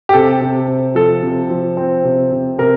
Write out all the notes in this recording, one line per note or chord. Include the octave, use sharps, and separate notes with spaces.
G4
C3 A4
C3
C3
F3 A4
C3
F3
C4
C3
C3
C3 A#4